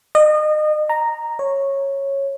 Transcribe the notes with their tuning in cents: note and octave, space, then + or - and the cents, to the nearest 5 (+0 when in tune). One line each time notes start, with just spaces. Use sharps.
D#5 -30
A#5 -5
C#5 -10